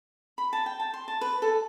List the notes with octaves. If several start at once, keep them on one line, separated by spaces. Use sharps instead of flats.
B5
A5
G5
A5
C6
A5
B4
A4